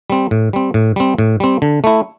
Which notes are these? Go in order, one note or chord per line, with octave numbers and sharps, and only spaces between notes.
G3 C4
A2
G3 C4
A2
G3 C4
A2
G3 C4
D3
A3 E4